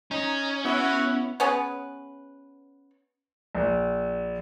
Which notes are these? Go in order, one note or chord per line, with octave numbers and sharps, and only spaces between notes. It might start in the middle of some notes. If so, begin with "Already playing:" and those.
C#4 D#4
B3 E4 F#4
B3 C#4 G#4 B4
A#1